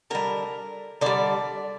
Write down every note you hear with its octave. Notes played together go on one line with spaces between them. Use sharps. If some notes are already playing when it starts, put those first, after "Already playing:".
D3 G3 A#4
D3 G3 D5